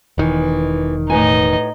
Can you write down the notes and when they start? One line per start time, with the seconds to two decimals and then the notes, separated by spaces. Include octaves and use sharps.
0.18 E1 B2 D#3 E3
1.10 A2 D#4 B4 D#5 G#5